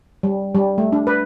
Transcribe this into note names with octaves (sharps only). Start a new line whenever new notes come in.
G3
G3
A3
D4
B4